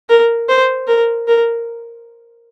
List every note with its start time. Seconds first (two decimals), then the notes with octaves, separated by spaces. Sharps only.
0.09 A#4
0.48 C5
0.87 A#4
1.27 A#4